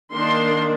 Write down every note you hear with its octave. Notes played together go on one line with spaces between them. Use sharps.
D#3 A#3 D4 C6